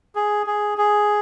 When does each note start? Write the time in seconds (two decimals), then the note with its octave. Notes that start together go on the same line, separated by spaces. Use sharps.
0.15 G#4
0.46 G#4
0.78 G#4